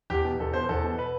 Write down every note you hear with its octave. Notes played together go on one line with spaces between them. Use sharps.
E2 G4
B2
E2 A4
B2 C5
E2 A4
B2
B4